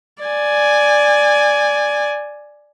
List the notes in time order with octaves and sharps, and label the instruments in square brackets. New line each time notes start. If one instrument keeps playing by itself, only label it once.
[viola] D5 G#5